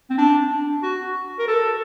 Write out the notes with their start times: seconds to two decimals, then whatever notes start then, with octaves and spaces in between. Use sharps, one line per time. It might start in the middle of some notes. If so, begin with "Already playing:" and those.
0.10 C4
0.18 D4
0.83 F#4
1.39 A#4
1.48 A4